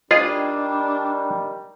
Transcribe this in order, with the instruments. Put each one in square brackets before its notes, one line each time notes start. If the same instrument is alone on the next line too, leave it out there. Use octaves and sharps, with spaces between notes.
[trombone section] D#3 G3 [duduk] D4 [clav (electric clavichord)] F4 G#4 [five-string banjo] D#5